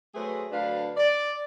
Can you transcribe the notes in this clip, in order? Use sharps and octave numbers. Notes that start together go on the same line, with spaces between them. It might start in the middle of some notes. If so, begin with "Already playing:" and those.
F#3 A3 G#4 B4 C5
D2 F#3 D4 B4 F5
D5